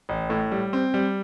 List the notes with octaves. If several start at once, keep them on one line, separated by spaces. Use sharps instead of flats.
A1
A2
G3
C4
G3